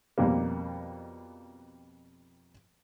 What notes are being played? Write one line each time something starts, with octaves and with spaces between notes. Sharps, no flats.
F2 B2 G3 A#3